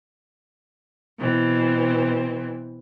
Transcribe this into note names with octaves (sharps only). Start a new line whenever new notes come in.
B2 E3 C4